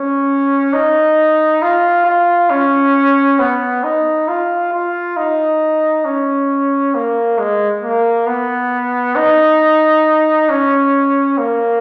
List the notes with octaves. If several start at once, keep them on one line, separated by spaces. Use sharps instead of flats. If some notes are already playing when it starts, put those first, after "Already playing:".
Already playing: C#4
D#4
F4
F4
C#4
B3
D#4
F4
F4
D#4
C#4
A#3
G#3
A#3
B3
D#4
C#4
A#3